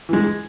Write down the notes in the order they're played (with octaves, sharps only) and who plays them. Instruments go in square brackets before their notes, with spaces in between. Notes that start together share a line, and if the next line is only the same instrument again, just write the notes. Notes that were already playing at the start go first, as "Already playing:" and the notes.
[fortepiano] E3 G#3